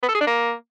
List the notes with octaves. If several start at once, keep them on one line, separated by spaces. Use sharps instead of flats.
B3
A4
G#4
D4
A#3